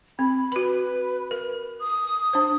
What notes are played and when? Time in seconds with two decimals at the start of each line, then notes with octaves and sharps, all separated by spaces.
0.19 C4 B5
0.52 F#4 B4 B5
1.31 A#4
1.81 D#6
2.33 D4 C5